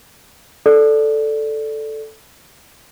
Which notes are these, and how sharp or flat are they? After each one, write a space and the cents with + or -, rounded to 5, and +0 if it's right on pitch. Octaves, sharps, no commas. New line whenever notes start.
A4 +0 D5 +0